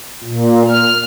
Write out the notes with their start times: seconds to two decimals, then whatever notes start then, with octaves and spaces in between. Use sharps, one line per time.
0.24 A#2
0.68 F6